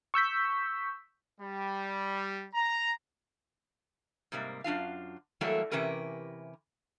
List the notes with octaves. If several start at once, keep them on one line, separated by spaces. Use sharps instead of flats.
C#6 E6 G6 B6
G3
A#5
G#2 C3 G3 A#3
F#2 D4 F4 F5
E3 F#3 G3 A3 A#3 A4
C3 E3 C#4 G4 A#4 B4